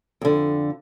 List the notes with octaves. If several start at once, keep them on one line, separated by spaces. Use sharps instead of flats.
F2 D3